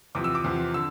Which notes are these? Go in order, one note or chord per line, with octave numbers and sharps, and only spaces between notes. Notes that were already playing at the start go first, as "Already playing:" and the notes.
E2 C3 F3 D6
E6
D6
E2 C3 F3
D3 E6